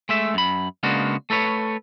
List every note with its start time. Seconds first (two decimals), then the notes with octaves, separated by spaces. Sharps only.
0.09 G#3 A3 E5
0.34 F#2 B5
0.83 C#3 G#3 A#3 B3 D4 F#4
1.30 A3 A4 B4 C#5